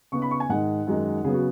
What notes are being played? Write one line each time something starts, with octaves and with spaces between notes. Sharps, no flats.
C#3 B3 D#4 C#6
B5
C#6
G#5
G#2 D#3 G#3 D#4 F#5
F#2 D#3 G#3 D#4
C#3 F#3 B3 G#4
F#4